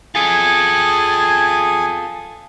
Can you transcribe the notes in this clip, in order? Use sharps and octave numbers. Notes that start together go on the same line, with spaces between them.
F4 G#4 A4 G#5